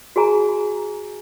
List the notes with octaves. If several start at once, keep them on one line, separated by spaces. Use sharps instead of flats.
F#4 G#4 G#5 A#5